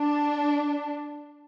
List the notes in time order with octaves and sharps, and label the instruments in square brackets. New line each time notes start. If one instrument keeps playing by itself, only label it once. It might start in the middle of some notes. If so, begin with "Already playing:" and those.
Already playing: [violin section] D4